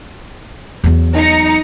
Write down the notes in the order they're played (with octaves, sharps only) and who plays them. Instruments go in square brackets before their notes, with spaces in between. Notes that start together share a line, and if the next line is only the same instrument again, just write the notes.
[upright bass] E2 F#3
[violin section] D#4 A#5 C#7